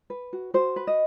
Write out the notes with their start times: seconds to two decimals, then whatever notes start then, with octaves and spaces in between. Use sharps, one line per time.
0.10 B4
0.33 F#4
0.54 F#4 C5
0.76 B4
0.87 D#5